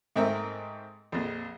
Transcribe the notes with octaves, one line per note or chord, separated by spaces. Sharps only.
G#2 A3 C4 A#4 E5
A#1 F2